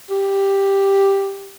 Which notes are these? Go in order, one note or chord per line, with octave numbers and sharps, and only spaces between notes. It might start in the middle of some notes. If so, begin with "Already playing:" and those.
G4